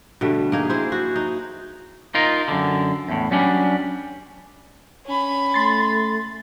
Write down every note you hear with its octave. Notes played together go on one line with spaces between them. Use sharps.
B2 D3 G3 A3
A#3 D#4 G#4
E4 G#4 C5
F#4
D#4
D#4 F4 A#4
F#2 D3
E2 A2
F#3 G3 C#4 D4
C#4 B5
A3 C6 A6